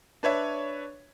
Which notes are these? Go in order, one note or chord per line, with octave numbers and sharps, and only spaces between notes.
D4 B4 C#5 E5